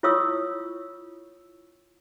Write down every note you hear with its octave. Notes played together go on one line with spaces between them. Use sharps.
E4 F4 C#5 C#6 D#6 E6